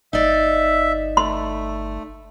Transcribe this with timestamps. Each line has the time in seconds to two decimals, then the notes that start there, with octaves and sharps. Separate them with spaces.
0.13 G1 D#4 D5 E5
1.17 A3 C6